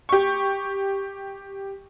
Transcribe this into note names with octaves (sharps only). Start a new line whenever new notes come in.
G4 C#6